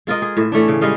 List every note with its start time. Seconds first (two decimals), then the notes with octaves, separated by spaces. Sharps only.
0.07 G#3 F4 A#4 D#5
0.22 G#4
0.37 A2 E5
0.52 E3 A3 C#4 D4
0.68 C#3
0.81 G3 G#3 D#5 F5